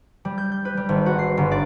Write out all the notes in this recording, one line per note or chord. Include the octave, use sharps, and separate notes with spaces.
G3
G6
G6
B4
G3
G#1
F#4
C7
G1
D5